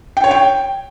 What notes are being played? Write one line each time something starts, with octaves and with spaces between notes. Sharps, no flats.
G5
C#5
G5